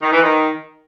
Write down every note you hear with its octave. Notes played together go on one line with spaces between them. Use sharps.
D#3
E3
D#3